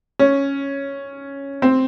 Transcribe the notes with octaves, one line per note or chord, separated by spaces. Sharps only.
C#4
C4